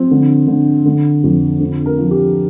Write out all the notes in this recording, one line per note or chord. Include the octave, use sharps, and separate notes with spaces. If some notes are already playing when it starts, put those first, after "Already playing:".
Already playing: F3 C4
D3
D3
D3
F2
D3
A#4
F3
G4